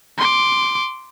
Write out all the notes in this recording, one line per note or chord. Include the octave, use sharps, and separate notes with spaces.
C6 D6